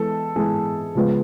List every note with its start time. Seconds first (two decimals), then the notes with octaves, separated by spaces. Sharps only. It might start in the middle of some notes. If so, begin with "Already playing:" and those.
Already playing: E3 G#3 B3 A4
0.36 E3 G#3 B3 G#4
0.95 C#3 F3 G#3 B3